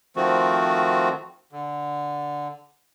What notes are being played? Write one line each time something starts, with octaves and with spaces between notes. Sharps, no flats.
D#3 F3 A3 C4 F#4
D3